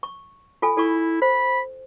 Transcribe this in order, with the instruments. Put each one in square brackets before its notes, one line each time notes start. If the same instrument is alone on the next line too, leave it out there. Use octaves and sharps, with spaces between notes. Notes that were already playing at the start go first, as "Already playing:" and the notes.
[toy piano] C#6
F4 A4 G#5
[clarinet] E4 [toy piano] A4 C#6
[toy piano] C5 [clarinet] B5